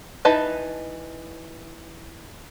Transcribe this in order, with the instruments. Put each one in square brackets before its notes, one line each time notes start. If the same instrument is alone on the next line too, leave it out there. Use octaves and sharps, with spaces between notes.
[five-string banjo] E3 D#4 B4 A5